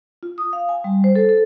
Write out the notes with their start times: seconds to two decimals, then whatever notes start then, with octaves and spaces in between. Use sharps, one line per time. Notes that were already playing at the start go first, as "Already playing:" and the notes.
0.23 F4
0.38 D#6
0.53 F5
0.69 G#5
0.84 G3
1.04 C5
1.16 A4
1.29 A4